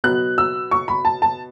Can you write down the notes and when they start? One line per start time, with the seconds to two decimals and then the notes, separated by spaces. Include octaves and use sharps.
0.04 B2 F#3 B3 F#6
0.38 E6
0.71 C#6
0.88 B5
1.05 A5
1.22 A5